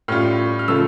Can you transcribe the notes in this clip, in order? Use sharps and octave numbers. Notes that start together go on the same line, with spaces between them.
A2 G3 C#4 F4 F6
F6
C#3 F3 A3 C#4 F4 E6